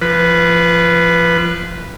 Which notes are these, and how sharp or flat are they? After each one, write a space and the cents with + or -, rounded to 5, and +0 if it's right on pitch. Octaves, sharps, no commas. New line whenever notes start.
F3 -25 B4 +0